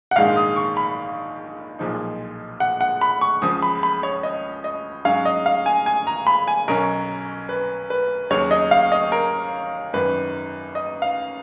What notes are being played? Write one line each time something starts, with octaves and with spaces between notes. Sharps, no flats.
F#5
A#1 G#2 D#3 G#3 F5
D#6
C#6
B5
B1 A#2 F3 G#3 D#4
F#5
F#5
B5
C#6
C#2 C#3 F3 D#6
B5
B5
C#5
D#5
D#5
G#2 F#3 C#4 F5
D#5
F5
G#5
G#5
A#5
B5
G#5
B1 B2 F#3 C#4 A#4
B4
B4
D#2 C#3 F#3 C#5
D#5
F5
D#5
A#4
G#1 F#2 D#3 B4
D#5
F5